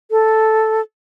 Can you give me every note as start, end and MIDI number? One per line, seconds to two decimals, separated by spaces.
0.11 0.81 69